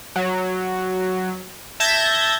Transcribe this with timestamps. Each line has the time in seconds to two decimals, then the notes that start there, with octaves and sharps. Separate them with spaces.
0.16 F#3
1.80 E5 A5 G6 G#6 A#6